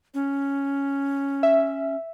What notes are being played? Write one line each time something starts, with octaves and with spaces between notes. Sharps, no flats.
C#4
E5